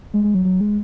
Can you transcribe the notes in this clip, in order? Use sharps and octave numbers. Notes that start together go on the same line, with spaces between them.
G#3
G#3
F#3
F#3
G#3